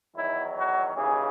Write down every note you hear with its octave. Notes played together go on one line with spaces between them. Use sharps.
E2 D#3 F#3 E4
F#4
D#2 C#3 E3 G#4